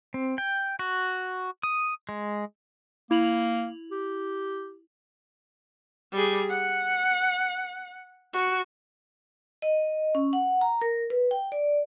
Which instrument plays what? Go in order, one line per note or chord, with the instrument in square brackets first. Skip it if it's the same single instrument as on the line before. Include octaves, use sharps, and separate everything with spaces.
[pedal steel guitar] C4
G5
F#4
D#6
G#3
[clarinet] A#3 [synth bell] E4 F7 F#7
[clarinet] G4
[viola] G3 G#4
F#5
F#4
[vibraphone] D#5
C#4
F#5
A#5
A#4
B4
G5
D5